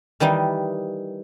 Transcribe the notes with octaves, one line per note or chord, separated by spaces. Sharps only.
D#3 E3 G3 D#4